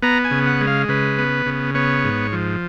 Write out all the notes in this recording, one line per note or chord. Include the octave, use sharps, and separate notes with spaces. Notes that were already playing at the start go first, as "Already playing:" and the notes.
B3 A#5
G#5
C#3
F#5
G#3
F5
C#3 B4
B3
C#3
B3 C#5
G#2
F3